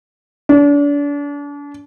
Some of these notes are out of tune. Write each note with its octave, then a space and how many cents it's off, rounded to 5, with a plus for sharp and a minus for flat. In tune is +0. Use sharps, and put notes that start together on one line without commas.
D4 -35